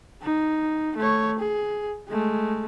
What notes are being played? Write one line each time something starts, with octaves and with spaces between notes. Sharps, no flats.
D#4
A3 C#5
G#4
G#3 A3